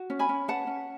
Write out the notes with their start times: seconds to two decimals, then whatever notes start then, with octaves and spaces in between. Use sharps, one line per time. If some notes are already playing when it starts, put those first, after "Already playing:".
Already playing: F#4
0.10 C#4
0.19 G#5 B5
0.29 C#4
0.48 B4 F#5 A5
0.67 C#4